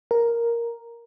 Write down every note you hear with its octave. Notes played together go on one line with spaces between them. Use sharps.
A#4